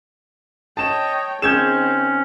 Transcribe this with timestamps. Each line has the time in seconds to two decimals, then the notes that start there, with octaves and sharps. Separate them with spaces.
0.77 C#5 D#5 G5 A5 E7
1.42 D#3 C4 C#4 G#4 G6 G#6 E7